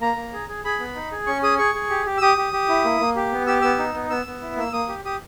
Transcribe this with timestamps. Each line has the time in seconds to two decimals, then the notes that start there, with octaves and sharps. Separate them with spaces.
0.01 A#3 A#5
0.17 A#3
0.33 G#4
0.48 G#4
0.65 G#4 B5
0.80 B3
0.95 D#4
1.12 G#4
1.27 C#4 C#6
1.43 G#4 D#6
1.58 G#4 C#6
1.75 G#4
1.90 G4
2.06 G4
2.18 E6
2.22 G4 D#6
2.38 G4
2.53 G4
2.69 E4
2.85 A#3
3.01 A#3
3.16 G4
3.32 B3
3.47 G4 E6
3.62 B3 E6
3.79 D#4
3.94 B3
4.10 B3 E6
4.26 B3
4.41 E4
4.57 A#3 E6
4.73 A#3 D#6
4.89 G4
5.05 G4 D#6